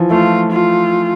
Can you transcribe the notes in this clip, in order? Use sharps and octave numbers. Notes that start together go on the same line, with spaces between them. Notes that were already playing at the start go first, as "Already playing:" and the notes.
Already playing: E3 F3
A3 F4
F4